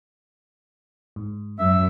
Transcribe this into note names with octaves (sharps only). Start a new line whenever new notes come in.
G#2
F#2 E5